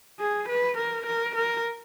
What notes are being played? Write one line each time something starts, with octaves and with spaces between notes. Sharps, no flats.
G#4
B4
A#4
A#4
A#4